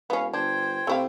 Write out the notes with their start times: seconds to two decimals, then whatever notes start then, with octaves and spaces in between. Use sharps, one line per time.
0.10 E1 B3 C#4 F5
0.33 G1 D4 C5 G5 G#6
0.87 C3 A3 E4 F5